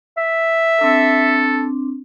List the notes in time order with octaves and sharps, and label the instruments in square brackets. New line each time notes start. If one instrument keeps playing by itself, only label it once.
[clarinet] E5
[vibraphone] C4 D4 [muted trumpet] A4